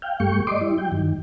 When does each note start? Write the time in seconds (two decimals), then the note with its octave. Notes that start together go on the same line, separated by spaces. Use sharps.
0.02 F5 G5
0.20 G2 G3 A3 G5 C#6
0.47 D5 D#5 C6 D6
0.61 G3 E4
0.78 F#3 G5
0.92 G2 D#3